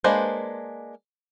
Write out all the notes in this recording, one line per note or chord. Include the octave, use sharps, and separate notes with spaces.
G#3 A#3 D4 B4 C5